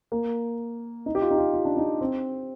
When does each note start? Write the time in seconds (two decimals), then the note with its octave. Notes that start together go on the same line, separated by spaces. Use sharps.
0.12 A#3
1.06 D#4
1.15 G4
1.22 F4
1.30 D#4
1.38 F4
1.53 F4
1.65 D4
1.77 D#4
2.01 C4